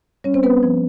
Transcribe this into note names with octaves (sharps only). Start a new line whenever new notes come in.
G3 C#4 C#5
C4 C5
G3 B3 B4
F3